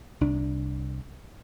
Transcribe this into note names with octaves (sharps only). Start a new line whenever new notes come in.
C2 D4